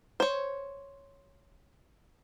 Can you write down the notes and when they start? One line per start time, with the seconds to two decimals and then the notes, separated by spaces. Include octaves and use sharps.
0.20 C5 C#5